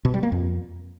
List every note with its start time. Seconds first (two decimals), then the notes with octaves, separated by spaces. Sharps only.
0.05 B2
0.14 G3
0.23 A#3
0.32 F2